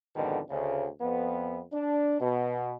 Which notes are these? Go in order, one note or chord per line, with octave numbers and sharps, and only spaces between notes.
F2 G#2 B2 D3 D#3
D2 C#3
F2 B3
D4
B2